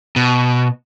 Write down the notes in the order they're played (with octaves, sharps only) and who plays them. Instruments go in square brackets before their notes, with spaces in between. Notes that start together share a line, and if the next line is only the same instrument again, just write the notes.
[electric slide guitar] B2